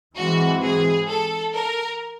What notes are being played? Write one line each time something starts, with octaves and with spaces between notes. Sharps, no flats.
G#2 E3 G#3 C4 F#4
G#4
A4
A#4